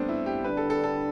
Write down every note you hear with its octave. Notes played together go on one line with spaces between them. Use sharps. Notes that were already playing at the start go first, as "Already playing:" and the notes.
Already playing: G3 A3 B3 C4 D4
E4
G4
D3 G3 D4 B4
A4
A4
A4